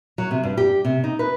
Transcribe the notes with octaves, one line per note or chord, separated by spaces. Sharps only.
F#3
C3
G2
G4
C3
D#4
B4